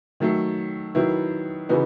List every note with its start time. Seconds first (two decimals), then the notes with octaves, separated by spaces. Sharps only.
0.20 D#3 F#3 A3
0.95 D#3 F#3 B3 E4
1.69 C#3 E3 B3 D#4 F#4